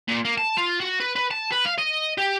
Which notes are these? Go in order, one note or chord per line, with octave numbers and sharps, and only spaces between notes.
A#2
A#3
A5
F4
F#4
B4
B4
A5
B4
F5
D#5
G4